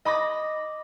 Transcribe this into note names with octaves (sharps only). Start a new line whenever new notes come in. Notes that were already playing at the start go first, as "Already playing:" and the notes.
D#5 B5 D6 A#6